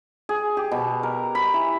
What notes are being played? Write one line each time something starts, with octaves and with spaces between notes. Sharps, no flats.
G#4
G4
B2
A#4
B5
E3